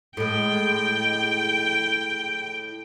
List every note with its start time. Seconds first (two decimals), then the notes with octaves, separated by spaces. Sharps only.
0.17 A2 G#3 G5